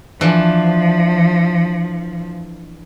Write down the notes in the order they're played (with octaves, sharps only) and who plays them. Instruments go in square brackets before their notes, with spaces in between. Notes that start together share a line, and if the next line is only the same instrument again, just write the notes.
[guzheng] E3 D4 [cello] F3